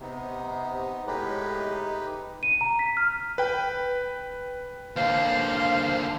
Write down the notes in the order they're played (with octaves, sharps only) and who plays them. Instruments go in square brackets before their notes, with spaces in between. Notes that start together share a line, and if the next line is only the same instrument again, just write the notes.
[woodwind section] C3 [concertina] B3 D#4
[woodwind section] A2 G#3 [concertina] D#4 G4 B4
[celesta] D#7
A#5
B6
F6
[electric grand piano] B4 G5
[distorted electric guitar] D#2 D3 [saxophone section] C5 F5